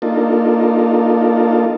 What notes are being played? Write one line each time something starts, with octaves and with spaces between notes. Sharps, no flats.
A#3 D4 D#4 F4 A4